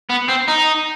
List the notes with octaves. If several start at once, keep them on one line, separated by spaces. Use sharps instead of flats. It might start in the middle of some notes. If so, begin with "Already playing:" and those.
B3
C4
D#4